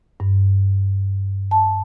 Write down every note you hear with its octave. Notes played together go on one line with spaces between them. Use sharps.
G2
A5